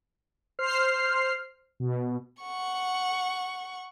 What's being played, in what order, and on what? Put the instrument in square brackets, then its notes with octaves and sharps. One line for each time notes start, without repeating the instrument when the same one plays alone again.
[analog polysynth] C5 F6 C7
B2
[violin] F#5 C#6